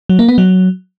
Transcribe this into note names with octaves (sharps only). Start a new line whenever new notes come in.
F#3
A#3
B3
F#3